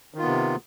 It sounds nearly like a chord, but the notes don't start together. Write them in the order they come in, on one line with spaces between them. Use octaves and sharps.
D#3 F4 B3 C3